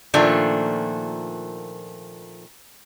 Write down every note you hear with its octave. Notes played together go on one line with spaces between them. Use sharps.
A#2 D#3 F3 A3 A#3 D4